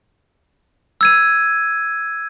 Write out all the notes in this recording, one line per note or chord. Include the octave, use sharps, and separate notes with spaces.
E6 G#6 D#7